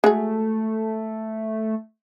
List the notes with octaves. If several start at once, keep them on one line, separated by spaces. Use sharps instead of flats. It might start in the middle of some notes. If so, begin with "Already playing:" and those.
G#3 A3 F#4 G#4